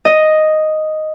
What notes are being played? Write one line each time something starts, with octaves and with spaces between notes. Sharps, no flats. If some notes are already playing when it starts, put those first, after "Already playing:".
D#5